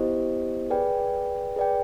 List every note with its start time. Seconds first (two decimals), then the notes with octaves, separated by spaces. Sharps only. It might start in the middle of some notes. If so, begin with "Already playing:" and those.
Already playing: B3 E4 G4 C5 D#5
0.70 G#4 B4 D5 G5
1.56 G#4 B4 D5 G5